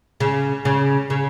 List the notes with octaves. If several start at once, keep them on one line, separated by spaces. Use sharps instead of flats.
C#3
C#3
C#3